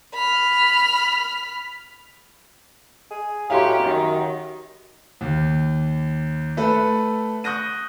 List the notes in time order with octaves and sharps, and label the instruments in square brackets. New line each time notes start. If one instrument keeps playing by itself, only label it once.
[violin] B5 F6
[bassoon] G#4
[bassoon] A2 [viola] C#4 G4 [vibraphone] F#4 D#5 A#5 [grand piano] F5 C6
[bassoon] F#2 [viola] D#3
[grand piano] D#2
A3 A4 B4
C#6 D#6 F#6 G6 A#6 D#7